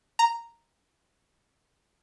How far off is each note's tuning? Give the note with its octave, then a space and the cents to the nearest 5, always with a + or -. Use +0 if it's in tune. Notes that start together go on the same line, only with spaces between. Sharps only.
A#5 -5